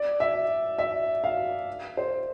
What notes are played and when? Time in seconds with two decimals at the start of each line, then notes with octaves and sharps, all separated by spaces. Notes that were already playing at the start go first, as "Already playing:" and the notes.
Already playing: D5
0.20 E5
0.78 E5
1.24 F5
1.97 C5